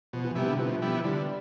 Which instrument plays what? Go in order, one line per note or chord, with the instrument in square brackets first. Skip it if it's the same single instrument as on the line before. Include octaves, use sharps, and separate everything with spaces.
[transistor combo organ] B2 [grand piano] F3
[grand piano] E3
[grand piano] C3 [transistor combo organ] G3 B3 E4
[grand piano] D3
[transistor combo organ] B2 [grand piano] F3
[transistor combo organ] G3 B3 E4
[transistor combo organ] D3 [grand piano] G3